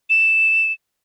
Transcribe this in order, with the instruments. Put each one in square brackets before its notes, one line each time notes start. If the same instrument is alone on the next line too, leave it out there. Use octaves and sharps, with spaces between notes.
[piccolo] E7